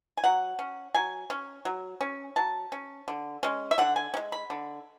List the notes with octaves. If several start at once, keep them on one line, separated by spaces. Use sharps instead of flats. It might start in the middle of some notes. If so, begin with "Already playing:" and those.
G#5
F#3 F#5
C#4
F#3 G#5
C#4
F#3
C#4
F#3 A5
C#4
D3
G#3 C#4
E5
D3 F#5
G#5
C#4
G#3
B5
D3